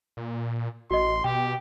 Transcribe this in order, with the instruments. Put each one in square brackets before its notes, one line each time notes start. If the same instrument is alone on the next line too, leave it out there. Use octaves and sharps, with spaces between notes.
[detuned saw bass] A#2
[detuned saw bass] A1 [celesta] F#4 D#5 [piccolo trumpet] C6
[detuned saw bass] B2 [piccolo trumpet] G4 [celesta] G5